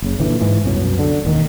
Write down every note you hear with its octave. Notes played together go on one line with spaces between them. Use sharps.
F#1 C#3
A#2 D3 E3
G#2 E3
C2 F#2 B2 F#3
D3
E1 D#2 D#3